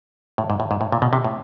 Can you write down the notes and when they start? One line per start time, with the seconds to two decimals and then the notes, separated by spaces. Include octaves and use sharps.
0.38 A2
0.50 G#2
0.60 A2
0.71 G#2
0.81 A2
0.92 A#2
1.02 B2
1.13 C3
1.24 A2